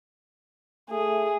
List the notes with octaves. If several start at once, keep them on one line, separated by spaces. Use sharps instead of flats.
A3 G#4